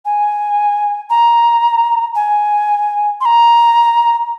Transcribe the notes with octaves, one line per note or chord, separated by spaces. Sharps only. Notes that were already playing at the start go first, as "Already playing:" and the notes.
G#5
A#5
G#5
C6
A#5